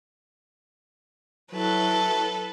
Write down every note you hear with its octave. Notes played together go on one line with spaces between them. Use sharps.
F#3 E4 A4 B4